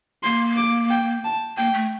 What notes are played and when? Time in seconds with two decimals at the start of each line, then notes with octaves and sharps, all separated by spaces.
0.23 A#3 C6
0.57 D6
0.90 G5
1.25 A5
1.57 A#3 G5
1.74 A3